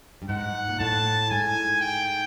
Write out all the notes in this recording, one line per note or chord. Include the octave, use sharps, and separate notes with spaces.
G2
G#2 F#5
A#2
A2 A5
G#2 G#5
G5